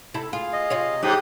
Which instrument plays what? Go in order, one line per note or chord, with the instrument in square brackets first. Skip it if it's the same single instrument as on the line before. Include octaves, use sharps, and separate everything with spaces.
[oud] C3 E4 A4
[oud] F4 [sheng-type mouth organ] G#4 F5
[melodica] D#5
[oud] C3 F4 C#5
[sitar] G#2 [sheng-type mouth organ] G4 D#6